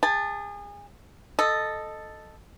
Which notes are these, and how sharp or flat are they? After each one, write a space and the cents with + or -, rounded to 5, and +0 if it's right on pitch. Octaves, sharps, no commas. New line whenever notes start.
G#4 -30 A5 +0
A4 +0 D#5 -10